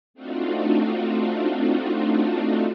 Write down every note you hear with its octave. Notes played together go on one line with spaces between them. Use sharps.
A3 C4 D4 D#4 F4 F#4